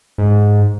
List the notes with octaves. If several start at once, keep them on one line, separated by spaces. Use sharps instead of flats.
G#2